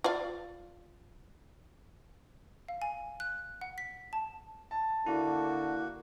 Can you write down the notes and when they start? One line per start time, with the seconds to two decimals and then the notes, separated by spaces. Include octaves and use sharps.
0.04 F4 D5 F5
2.68 F5
2.82 G#5
3.20 F#6
3.61 F#5
3.78 B6
4.13 A5
4.71 A5
5.06 D3 A#3 E4 F#4